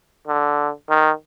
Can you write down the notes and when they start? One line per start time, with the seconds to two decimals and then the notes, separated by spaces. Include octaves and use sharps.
0.27 D3
0.89 D#3